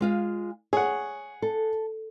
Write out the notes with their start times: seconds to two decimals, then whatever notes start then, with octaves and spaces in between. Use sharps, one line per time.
0.01 G#3 F4 F5
0.73 G#4 C#5 F#5
1.42 A4